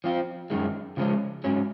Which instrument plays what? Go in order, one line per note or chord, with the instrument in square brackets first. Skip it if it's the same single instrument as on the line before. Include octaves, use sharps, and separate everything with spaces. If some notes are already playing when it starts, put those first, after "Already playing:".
[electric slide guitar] F3 C4 F4
F#2 D#3 G#3
C#3 F3 G#3 C#4
G#2 F#3 C#4